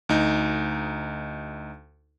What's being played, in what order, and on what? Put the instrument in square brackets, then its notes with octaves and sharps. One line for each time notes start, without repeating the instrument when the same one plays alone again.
[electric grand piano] D2 D#4